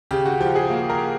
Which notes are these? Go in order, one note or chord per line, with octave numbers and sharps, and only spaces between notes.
C#3 G4
F#4
F3 G4
G#4
A#3
A#4